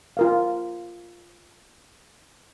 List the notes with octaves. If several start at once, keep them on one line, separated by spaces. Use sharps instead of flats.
F4 A#4 F5